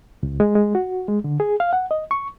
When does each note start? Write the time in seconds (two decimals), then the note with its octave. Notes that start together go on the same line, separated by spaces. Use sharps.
0.23 C#2
0.40 G#3
0.55 G#3
0.75 F#4
1.08 G#3
1.24 D3
1.40 G#4
1.60 F5
1.73 F#5
1.91 D#5
2.11 C#6